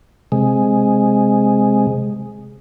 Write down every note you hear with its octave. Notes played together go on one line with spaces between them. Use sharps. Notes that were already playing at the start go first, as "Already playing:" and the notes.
C3 G#3